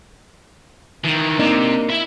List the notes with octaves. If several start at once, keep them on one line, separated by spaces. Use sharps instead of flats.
D#3 E3
C3 A#3 D4 D#4
E4 E5